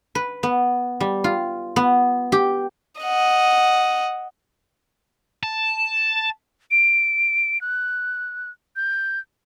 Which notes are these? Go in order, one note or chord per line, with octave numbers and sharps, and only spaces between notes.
B4
B3
G3
F4
B3
G4
D#5 F#5
A5
D7
F#6
G6